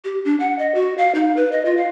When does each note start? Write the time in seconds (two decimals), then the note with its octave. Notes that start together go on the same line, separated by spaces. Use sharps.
0.05 G4
0.25 D4
0.40 F#5
0.59 D#5
0.75 F#4
0.98 F5
1.15 D#4
1.37 B4
1.52 D#5
1.65 F4
1.77 F5